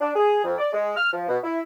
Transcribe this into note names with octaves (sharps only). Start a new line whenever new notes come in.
D4
G#4
F2
D5
G#3
F6
F3
B2
E4